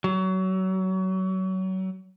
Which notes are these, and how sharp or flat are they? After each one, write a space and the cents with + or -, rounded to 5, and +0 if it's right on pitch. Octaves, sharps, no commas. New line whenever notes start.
F#3 +30